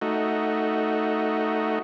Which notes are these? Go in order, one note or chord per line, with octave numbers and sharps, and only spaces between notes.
A3 D#4 F#4